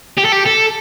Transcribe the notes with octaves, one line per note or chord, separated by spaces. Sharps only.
G4
A4
G4
A4